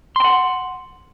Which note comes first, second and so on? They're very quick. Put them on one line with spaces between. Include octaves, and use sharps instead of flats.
C6 G5 F#5